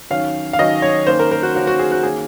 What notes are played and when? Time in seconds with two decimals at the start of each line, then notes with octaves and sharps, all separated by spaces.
0.10 D#3 F#3 C#4 F5
0.53 F5
0.59 D#3 F#3 C#4 D#5
0.82 C#5
1.06 D#3 A#3 C#4 C5
1.19 A#4
1.31 A#4
1.43 F#4
1.55 D#3 A#3 C#4 F#4
1.67 F#4
1.79 G#4
1.91 F#4
2.03 D#3 A#3 C#4 G#4